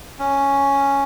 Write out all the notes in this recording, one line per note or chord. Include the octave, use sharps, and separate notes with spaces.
C#4